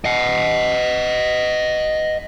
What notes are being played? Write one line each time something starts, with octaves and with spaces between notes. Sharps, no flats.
D#5 F#5